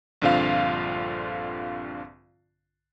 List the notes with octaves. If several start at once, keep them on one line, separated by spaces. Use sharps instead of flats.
A#1 G2 D3 C4 F4 F5